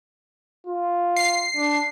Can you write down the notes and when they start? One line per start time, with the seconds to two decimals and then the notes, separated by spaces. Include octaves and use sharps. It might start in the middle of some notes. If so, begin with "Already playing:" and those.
0.67 F4
1.16 C7
1.57 D4